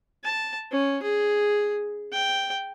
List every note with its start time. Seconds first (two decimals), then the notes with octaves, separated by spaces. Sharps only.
0.24 A5
0.72 C#4
1.02 G#4
2.12 G5